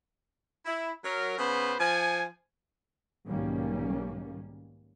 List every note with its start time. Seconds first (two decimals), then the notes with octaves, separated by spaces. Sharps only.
0.66 E4
1.04 F#3 A#4
1.37 C#3 B3 B4 C5
1.78 F3 G#5
3.27 B1 G#2 D#3 G3 A#3 C#4